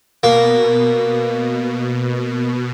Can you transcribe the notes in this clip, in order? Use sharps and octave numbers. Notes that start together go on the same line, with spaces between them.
B2 A#3